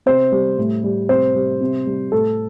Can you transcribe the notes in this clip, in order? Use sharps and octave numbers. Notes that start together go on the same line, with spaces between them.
C3 C5
G3
A2
G3
C3 C5
G3
C3
G3
A2 A4